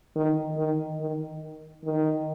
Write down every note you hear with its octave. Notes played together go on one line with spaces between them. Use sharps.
D#3
D#3
D#3
D#3